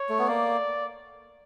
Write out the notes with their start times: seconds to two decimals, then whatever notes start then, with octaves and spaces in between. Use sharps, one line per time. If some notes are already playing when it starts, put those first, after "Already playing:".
Already playing: C#5
0.09 A3
0.19 B3
0.28 A#3 D5